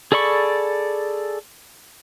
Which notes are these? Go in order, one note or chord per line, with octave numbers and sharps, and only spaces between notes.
G#4 A4 D5 B5 C#6